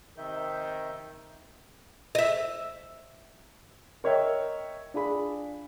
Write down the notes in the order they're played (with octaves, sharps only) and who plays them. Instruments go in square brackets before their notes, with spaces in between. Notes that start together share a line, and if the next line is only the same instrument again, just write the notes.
[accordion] C3 E5 G6 [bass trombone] D#3
[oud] D#5 E5
[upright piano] A#4 C#5 D#5 E5 G5
D4 F4 G#4 B5